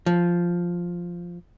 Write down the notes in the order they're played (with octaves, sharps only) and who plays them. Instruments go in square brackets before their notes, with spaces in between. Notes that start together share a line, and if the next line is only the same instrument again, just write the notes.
[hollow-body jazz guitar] F3